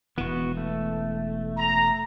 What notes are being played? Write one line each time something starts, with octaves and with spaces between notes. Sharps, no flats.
E1 E3 B3 F#4
A3
A#5